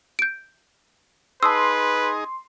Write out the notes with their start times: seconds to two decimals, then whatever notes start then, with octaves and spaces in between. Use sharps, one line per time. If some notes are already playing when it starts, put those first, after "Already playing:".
0.19 G6 D7
1.43 D#4 G#4 B4 A5 C6 D#6 E6